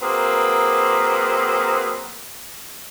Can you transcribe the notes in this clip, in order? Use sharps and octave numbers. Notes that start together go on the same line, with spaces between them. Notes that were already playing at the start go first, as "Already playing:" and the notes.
F#3 A#3 C4 G#4 B4